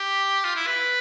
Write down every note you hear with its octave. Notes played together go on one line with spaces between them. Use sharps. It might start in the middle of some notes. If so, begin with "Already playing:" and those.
Already playing: G4
F4
E4
B4